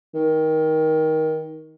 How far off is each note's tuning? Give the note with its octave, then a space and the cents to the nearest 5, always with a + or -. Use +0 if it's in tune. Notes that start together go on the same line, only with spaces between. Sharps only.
D#3 +20